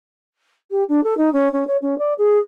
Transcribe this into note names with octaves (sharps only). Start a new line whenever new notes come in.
G4
D4
A4
D#4
C#4
C#4
C#5
C#4
D5
G#4